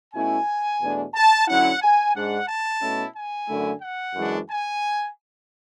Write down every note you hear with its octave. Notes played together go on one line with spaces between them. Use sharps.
B2 A3 C#4 E4 G#5
E2 B2 A3 D4
A5
D3 F#3 C#4 E4 F#5
G#5
G#2 G#3 D4 F#5
A5
B2 A3 C#4 E4
G#5
F#2 D3 A3 E4
F#5
F#2 E3 G#3 D4
G#5